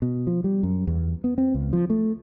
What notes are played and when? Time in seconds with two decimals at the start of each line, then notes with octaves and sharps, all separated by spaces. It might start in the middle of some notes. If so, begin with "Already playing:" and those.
0.02 B2
0.27 F3
0.44 G3
0.63 F#2
0.87 E2
1.24 B3
1.38 C4
1.54 C#2
1.73 F3
1.90 A3